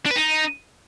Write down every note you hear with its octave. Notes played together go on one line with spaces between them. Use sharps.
D4
B4
D#4